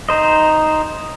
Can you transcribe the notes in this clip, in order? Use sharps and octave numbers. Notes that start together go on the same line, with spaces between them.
D#4 C5 D#5